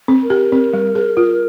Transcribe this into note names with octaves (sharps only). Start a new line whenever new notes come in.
C4
A#4
G4
C4
G3
G#4
F4